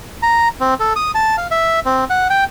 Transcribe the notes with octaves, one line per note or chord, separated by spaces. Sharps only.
A#5
C4
A4
D#6
A5
F5
E5
C4
F#5
G5